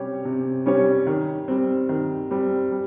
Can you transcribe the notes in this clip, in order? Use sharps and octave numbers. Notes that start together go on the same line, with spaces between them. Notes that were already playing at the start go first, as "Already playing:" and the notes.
Already playing: C3 G3 C#4 G4 C#5
C3
G3 C#4 G4 C#5
D#3
G3 C4
D#3
G3 C4
G3